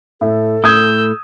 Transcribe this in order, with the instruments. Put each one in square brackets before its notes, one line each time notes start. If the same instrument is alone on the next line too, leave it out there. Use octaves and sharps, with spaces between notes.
[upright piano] A2 [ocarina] A4
[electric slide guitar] A2 [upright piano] D#6 G#6 [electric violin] E6 G6